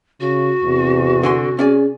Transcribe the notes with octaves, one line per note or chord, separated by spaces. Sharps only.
C#3 F#4
E2 C3
D3 G#5 C6
C#4 G#4 D5 G#5